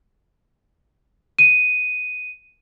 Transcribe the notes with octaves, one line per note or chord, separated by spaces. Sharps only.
D#7